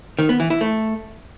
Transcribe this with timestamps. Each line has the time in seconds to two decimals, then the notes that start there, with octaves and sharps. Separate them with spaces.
0.19 D#3
0.29 B3
0.40 E3
0.50 E4
0.61 A3